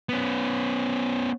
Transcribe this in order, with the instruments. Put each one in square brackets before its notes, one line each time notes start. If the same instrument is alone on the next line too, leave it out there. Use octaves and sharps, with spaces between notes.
[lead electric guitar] B3 C#4